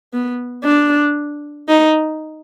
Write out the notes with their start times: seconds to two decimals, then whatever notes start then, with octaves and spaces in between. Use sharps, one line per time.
0.13 B3
0.64 D4
1.68 D#4